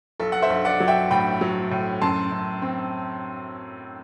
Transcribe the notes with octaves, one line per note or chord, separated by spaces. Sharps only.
B1 A4
F#5
C5 E5
B1
D5 F#5
F#3
E5 G5
A2 G5 B5
F#3
A2
F#2 A5 C6
F#2
C4